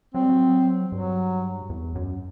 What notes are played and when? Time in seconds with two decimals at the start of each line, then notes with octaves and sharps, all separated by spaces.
0.14 F#3 C4
0.22 G3
0.29 F#3
0.92 G2 F#3
1.70 E2
1.96 F#2